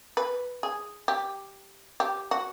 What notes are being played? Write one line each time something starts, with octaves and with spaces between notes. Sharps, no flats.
B4
G#4
G4
G4
F#4